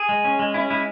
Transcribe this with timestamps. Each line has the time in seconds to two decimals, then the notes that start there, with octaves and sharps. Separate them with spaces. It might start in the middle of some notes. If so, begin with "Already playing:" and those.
Already playing: G#4
0.09 G#3
0.25 C#4
0.39 G#3
0.54 C#4 E4
0.70 G#3 E4